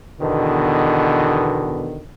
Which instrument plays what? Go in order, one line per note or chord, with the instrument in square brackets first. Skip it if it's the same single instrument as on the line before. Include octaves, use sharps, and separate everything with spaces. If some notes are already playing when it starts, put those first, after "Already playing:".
[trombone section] E2 B2 D3 D#3